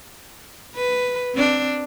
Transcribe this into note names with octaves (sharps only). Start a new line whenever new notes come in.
B4
C4 D4